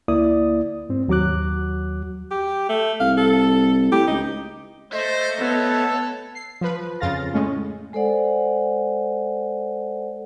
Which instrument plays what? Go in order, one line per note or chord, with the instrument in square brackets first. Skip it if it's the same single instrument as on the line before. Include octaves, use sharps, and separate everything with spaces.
[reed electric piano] D2 A#3 E4 D5 D#6
G#2 C4
D#2 F#3 F#4 D6 F#6
[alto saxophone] G4
A3
[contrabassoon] C2 [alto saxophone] F5
[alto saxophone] A4
[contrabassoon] A2 [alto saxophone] G4
[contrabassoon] C#2 [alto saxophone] D#4
[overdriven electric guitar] A3 [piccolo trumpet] C5 [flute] D#5
[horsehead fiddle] B3 C#5 [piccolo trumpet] A4
[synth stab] C7
F3 B4
F2 C#3 F4 F5 A6 A#6
A2 G#3 C#4
[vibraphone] G#3 A4 C5 D5 F#5